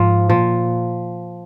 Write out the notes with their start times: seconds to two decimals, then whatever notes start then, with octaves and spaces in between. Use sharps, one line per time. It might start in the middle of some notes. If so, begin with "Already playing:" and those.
Already playing: G#2 F3
0.29 A#2 F3